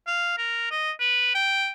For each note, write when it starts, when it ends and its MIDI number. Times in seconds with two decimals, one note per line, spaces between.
0.07 0.33 77
0.38 0.68 70
0.71 0.91 75
1.00 1.35 71
1.35 1.71 79